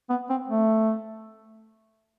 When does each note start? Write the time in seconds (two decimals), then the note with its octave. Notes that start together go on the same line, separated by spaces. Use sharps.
0.09 B3
0.30 C4
0.48 A3